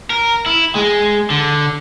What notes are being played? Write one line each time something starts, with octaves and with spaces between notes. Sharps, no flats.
A#4
E4
G#3
D3